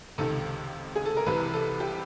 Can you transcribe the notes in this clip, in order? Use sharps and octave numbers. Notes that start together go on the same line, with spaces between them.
C#2 C3 D#3 A4
G#4
A4
A#4
C2 C3 E3 B4
A4
G4